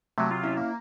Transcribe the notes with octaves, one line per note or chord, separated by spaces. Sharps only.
C3 F#3 A3
F4
C#4 E4
A#3